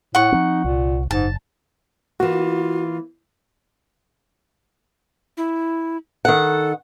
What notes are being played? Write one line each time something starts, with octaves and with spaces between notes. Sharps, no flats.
A2 F#5 C#6
F3 C4 D#4
C2 A#2
F#1 G#2 A5
E3 A#3 F4 F#4
E4
D#3 A4 F#5